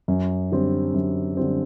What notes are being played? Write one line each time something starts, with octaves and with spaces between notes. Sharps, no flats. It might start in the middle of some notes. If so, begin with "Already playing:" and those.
F#2
D3 G3 C4
F#2
D3 G3 C4